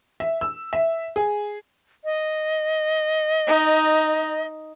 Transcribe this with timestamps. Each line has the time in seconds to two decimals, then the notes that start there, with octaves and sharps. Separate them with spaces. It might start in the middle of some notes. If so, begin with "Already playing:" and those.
0.20 E5
0.41 E6
0.73 E5
1.16 G#4
2.04 D#5
3.47 D#4